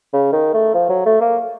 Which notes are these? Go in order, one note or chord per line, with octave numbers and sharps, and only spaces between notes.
C#3
D#3
A3
F3
F#3
A3
A#3